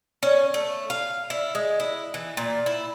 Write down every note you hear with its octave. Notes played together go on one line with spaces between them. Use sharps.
C#4
A3
F5
E4
G#3
E4
E3
A#2
E4